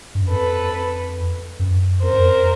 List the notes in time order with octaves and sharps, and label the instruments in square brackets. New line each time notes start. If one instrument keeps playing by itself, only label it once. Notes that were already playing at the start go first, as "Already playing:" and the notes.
[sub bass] G2
F#2
[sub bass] F2 [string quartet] A4 B4
[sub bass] F#2
[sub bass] F2 [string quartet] A#4 C5
[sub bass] F#2
F2